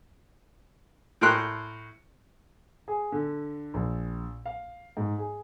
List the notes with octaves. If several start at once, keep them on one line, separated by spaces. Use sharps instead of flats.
A2 A#4 G5 C6 F#6
G#4
D3
A#1
F5
G#2
G#4